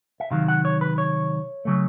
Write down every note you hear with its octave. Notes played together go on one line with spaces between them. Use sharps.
E5
C3 D#3 F#3 F5
F#5
C#5
B4
C#5
C#3 F#3 A3